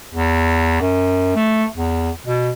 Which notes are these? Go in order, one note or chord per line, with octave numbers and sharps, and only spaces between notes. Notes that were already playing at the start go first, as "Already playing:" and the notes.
E2
F#2
A3
E2
B2